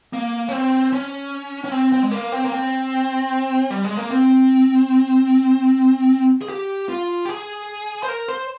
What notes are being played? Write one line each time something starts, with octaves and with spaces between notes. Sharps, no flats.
A#3
C#4
C4
C#4
C#4
C4
C4
G#3
A#3
C4
A#3
C4
G3
G#3
A#3
C4
G#4
G4
F4
G4
G#4
C5
A#4
C5